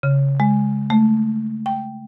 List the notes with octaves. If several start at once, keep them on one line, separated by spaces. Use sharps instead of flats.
C#3
G#3
A3
G5